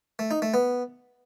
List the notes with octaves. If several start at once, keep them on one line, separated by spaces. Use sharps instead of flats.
A3
D#4
A3
B3